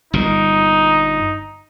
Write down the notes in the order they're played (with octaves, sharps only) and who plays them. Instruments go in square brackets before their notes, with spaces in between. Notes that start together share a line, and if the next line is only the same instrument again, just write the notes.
[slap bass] G1 A#2 [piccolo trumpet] D#4